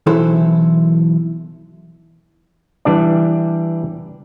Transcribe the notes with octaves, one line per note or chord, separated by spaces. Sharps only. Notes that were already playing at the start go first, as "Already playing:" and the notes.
B1 E3 E4 A4 C5
E3 G3 D4 D5